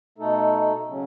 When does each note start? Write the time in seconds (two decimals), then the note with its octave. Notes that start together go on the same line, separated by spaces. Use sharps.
0.18 B2 A3 D#4 A4
0.87 C#3 F#3 C#4